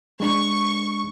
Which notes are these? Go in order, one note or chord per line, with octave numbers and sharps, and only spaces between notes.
G#3 D4 C#6